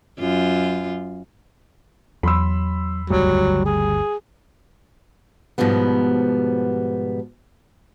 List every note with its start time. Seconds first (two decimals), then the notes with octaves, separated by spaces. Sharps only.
0.19 F#2 F4
2.23 E2 F#3 B5 C6 E6
3.10 G1 D2 C#3 F#3 G3
3.65 G#4
5.58 G#2 B2 F3 G3 B3